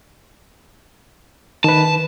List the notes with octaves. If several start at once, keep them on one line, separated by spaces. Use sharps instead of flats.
D#3 B4 A5